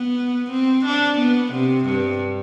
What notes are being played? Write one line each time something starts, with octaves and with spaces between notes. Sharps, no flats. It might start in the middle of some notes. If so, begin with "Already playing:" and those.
Already playing: B3
C4
D4
B3
C3
G2